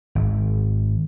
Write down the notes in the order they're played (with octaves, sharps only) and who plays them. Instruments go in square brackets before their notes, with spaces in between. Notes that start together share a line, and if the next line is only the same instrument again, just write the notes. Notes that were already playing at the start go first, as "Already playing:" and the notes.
[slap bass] G#1